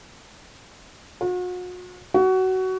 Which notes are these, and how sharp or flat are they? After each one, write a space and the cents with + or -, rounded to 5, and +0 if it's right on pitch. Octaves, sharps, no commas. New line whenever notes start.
F#4 -40
F#4 +20